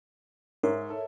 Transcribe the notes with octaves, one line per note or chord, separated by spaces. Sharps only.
G#2 A#4 C#5 E5
A4